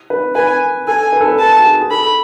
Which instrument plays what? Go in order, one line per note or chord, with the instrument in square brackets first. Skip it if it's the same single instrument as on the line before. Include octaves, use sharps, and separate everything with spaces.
[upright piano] B4
[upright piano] B4 [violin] G#5
[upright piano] A4 [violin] G#5
[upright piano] B4
A4
B4
[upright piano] A4 [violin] A5
[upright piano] F#4
G#4
G#4
[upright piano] A4 [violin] B5